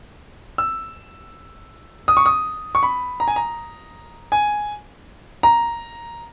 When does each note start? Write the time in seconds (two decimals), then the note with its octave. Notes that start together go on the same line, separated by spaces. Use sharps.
0.58 E6
2.08 D#6
2.17 C#6
2.26 D#6
2.75 C#6
2.83 B5
3.20 A#5
3.28 G#5
3.36 A#5
4.32 G#5
5.43 A#5